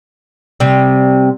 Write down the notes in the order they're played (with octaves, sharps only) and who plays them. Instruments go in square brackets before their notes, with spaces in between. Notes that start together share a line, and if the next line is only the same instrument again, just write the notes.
[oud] C3 G3